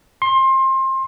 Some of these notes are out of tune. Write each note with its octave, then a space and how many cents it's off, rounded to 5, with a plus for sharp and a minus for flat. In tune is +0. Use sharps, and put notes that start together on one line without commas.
C6 +25